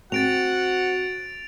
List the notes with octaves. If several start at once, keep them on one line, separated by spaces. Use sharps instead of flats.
C4 F#4 F#5 A6 D7 F7